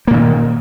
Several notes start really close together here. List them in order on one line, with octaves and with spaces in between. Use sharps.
A#3 A#2 D#3